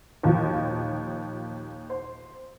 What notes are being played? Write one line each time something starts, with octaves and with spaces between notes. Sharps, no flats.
D#2 A#2 F3
C5